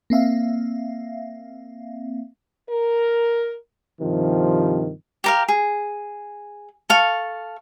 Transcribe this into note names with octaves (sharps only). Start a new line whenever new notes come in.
A#3 C4 E5 F5
A#4
G2 C3 D#3 F3
G4 A#4 F5
G#4
A4 F5 C#6